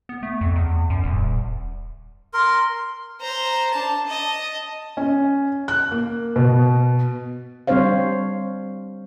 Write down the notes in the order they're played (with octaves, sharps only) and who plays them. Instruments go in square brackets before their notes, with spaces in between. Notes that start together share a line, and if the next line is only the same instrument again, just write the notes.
[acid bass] B3
A3
F2
E2
F#2
D#1
[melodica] A#4 [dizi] C6
[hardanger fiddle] C5 A#5
D4 A5
D#5 A5
[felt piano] C#4
F#6
A#3
B2
[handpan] G3 C4 D4 C5 C#5 F5